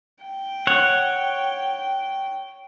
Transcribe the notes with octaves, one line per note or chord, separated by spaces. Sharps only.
G5
C#5 F#5